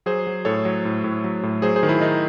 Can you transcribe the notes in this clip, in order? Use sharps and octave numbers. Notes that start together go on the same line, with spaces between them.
F#3 G#4 C5
F#3
A2 A4 C#5
F#3
A2
A2
F#3
A2
F#3 G#4 C5
G#4 C5
D#3
E4 G#4
D#3 D#4